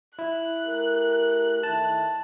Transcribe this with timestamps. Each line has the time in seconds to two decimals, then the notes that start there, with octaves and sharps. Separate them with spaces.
0.19 E4 F#6
0.66 A3 G4 A#4
1.63 D#3 A3 E4 A5